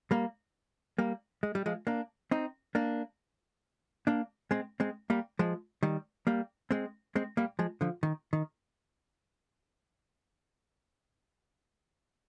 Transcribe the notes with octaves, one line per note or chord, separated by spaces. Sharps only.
G3 A#3
G3 A#3
G#3
G3
F3 G#3
A#3 D4
C4 D#4
A#3 D4
A#3 D4
G#3 C4
G#3 C4
G3 A#3
F3 G#3
D#3 G3
G3 A#3
G#3 C4
G#3 C4
G3 A#3
F3 G#3
D3 F3
D#3
D#3